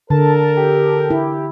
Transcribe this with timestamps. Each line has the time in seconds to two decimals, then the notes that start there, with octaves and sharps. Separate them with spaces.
0.10 D3 A4 A#4 A5
0.57 G4
1.10 E4